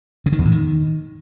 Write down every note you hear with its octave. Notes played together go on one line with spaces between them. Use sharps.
C#3
D#3
E2
A2
D#3